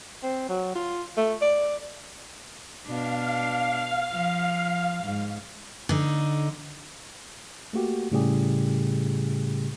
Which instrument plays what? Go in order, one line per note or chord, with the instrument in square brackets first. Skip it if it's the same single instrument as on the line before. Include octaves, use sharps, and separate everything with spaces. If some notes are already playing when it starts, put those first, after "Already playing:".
[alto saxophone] C4
F#3
F4
A3
D5
[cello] B2 D4 [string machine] F5
[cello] F3
G#2
[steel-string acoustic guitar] D3 D#4
[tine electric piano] A3 A#3 F#4 G4
A2 C#3 G3 A3 G4 G#4